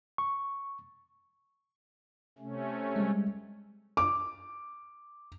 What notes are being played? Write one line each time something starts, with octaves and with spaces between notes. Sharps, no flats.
C#6
C3 A3 C#4
G3 G#3
D6